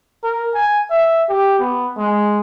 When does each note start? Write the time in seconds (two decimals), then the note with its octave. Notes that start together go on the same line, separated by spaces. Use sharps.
0.23 A#4
0.54 G#5
0.90 E5
1.29 G4
1.60 B3
1.97 G#3